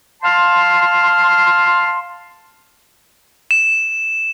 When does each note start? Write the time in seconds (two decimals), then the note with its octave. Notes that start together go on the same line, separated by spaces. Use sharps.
0.23 F5 A5 C6
3.51 E7